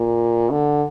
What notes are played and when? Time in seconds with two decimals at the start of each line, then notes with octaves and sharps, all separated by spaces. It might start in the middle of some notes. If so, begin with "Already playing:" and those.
Already playing: A#2
0.50 D3